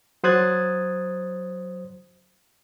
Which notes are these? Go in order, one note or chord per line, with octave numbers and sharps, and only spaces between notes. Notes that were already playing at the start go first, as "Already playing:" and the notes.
F#3 C5 D#6 F#6 G#6 A6